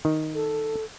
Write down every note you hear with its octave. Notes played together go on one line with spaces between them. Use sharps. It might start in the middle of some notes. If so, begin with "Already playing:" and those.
D#3
A4